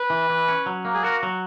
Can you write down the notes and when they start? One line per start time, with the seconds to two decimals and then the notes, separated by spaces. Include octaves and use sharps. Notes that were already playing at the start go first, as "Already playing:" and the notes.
Already playing: B4
0.10 E3
0.30 E3
0.48 C#4
0.66 F#3
0.85 A#3
0.95 G#4
1.04 F#4 A#4
1.23 F#3